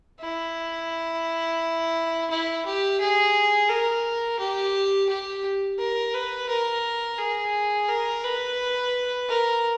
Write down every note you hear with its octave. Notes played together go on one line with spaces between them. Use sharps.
E4
E4
G4
G#4
A#4
G4
G4
A#4
B4
A#4
G#4
A#4
B4
A#4